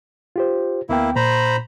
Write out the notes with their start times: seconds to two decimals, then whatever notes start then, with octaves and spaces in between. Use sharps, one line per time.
0.36 F4 G4 C5
0.89 D2 A#3 B3 E4 G5
1.16 A#2 C5 A#5 B5